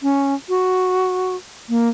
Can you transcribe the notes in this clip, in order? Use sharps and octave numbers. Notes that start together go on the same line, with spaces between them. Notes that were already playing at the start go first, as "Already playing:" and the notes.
C#4
F#4
A#3